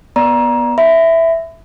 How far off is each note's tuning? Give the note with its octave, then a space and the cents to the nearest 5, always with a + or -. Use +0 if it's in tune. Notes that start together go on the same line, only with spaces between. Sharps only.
B3 -15 D5 +0 A#5 +25
E5 +0 B5 +30